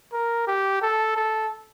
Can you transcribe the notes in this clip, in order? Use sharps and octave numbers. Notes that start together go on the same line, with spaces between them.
A#4
G4
A4
A4